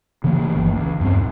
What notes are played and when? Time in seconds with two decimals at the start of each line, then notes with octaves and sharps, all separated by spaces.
0.24 C#3 E3 A3 A#3
0.55 G1 E3
0.74 C#2
1.00 E2 G2 A3 C4
1.14 D#1